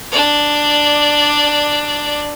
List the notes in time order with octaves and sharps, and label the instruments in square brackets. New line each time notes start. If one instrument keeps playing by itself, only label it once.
[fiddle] D4 D5